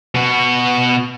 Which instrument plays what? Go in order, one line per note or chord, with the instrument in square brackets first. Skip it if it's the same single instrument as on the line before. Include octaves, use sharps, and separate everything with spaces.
[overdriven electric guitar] B2 F#4